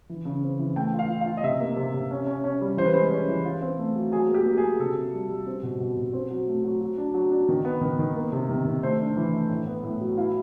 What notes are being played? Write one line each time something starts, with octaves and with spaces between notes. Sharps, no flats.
E3
C#3
C4
E3
A3 G5
F4
F5
F4
F5
F4
D#5
C3 E5
A#3
C3
C3
C#4
C#4
C#4
G3
E3 C5
B4
G#3 C5
C#4
E3
F4
C4
A3
F#3
F#3 G#4
A#3
G4
A#3
G#4
F#3
C3 A4
C3
G3
G3
C4
B2
B2
B2
C4
F#3
A3
F#3
F#3
D4
F#3
D4
D#3
B3
D#3
D#3
A#3
C3
D#3
D#3
A3 C5
D4
E3
A3
A2
B3
A2
F#3
E4 F5